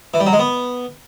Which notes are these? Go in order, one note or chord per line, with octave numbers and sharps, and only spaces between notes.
E3
G3
F#3
G#3
B3